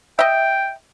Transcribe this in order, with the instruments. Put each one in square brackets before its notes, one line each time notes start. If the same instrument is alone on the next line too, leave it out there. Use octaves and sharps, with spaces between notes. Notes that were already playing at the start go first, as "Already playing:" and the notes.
[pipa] D#5 E5 [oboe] G5